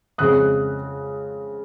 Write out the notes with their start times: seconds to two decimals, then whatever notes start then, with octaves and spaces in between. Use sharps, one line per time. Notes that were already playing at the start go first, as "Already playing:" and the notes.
0.18 F2 C#3 G#3 C4 D#6 F#6